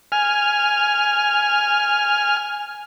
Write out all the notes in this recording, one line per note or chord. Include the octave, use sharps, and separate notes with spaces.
G#5 F6